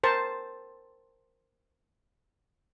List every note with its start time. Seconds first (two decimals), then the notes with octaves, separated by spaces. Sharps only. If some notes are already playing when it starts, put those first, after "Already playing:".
0.03 A#4 C5 A5